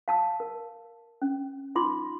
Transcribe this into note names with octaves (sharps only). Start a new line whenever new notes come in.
F5 A5 E6
A#4
C#4
D#4 F4 C6 D6